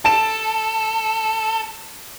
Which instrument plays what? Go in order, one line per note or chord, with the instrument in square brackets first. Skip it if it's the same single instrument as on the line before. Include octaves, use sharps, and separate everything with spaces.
[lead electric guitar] A4 [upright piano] A5 D7 E7